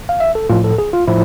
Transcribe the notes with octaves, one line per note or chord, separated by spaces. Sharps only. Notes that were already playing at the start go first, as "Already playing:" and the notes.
F5
E5
A4
A2 F3 F4
A4
G#4
F4
A2 F3 E4